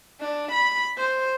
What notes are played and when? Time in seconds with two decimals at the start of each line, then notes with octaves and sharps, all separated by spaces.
0.21 D4
0.52 B5
0.98 C5